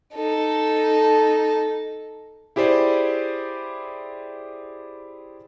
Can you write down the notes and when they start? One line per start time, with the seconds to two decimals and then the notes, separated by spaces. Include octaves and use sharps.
0.15 D#4 A4
2.56 E4 G4 G#4 C5 D5